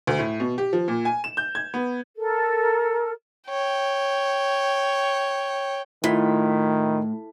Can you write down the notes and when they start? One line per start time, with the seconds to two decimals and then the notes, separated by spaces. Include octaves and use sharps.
0.07 D2
0.19 A2
0.40 B2
0.58 G4
0.73 F3
0.88 A#2
1.05 G#5
1.24 E7
1.37 G6
1.55 G#6
1.74 B3
2.16 A4 A#4
3.49 C#5 G5
6.04 A2 D#3 E4 F4 B6